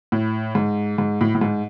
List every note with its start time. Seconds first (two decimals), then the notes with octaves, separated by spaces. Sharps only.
0.12 A2
0.55 G#2
0.98 G#2
1.21 A2
1.35 A2
1.41 G#2